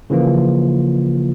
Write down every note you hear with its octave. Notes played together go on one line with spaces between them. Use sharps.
C#3 E3 F3 A#3 F4